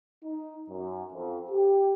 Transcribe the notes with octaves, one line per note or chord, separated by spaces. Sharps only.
D#4
F#2
F2
G4